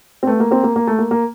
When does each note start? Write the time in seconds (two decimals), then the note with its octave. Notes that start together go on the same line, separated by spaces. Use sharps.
0.23 C4
0.27 A3 B3
0.40 A#3
0.51 A#3 C4
0.64 A#3
0.76 A#3
0.87 A3
0.99 A#3
1.11 A#3